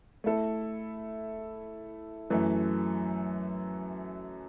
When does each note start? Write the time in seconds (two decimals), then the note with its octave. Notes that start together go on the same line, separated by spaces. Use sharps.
0.24 A3 E4 A4
2.30 F#2 E3 A3